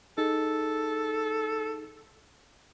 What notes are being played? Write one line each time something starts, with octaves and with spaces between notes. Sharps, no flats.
D#4 G#4 A4